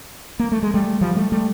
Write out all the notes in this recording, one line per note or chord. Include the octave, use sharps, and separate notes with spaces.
A#3
A3
G#3
G3 A3
F3 G3
G3 A3
G3 A3